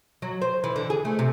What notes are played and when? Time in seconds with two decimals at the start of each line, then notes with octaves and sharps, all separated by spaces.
0.22 F#3
0.42 C5
0.64 E3
0.76 D3
0.90 G#4
1.05 A3
1.19 C3